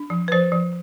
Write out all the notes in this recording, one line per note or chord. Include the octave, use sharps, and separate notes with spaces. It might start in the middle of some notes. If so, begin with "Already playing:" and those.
Already playing: D4
F3
B4
F3 C5
F3